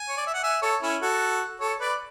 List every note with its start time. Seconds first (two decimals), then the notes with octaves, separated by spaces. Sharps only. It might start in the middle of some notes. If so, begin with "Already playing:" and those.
Already playing: G#5
0.09 C#5
0.17 D5
0.27 E5
0.34 F#5
0.43 E5 G#5
0.62 A4 C#5
0.82 C#4 E4
1.01 F#4 A4
1.60 A4 C#5
1.80 B4 D5